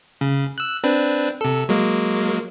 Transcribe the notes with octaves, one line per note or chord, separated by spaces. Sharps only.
C#3
E6 F#6
C4 D4 B4
C3 A4
F#3 G#3 A#3